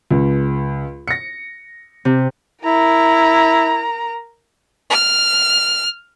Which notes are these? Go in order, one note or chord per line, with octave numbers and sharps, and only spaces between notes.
C#2
A#6 C#7
C3
E4 A#4 A#5
F6